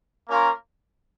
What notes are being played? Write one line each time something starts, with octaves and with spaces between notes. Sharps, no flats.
A#3 C#4 F4 A#4